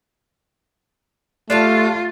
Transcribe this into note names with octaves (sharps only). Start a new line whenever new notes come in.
A3 D4 F4 G4 F5